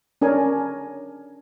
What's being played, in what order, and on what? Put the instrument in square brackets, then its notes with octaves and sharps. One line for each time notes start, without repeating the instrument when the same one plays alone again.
[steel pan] C#4 D4 A#4 G#5